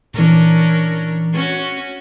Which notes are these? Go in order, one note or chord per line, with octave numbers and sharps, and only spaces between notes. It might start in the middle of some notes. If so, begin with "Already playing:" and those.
A#2 E3 C#4 D4 A#4
C#4 F#4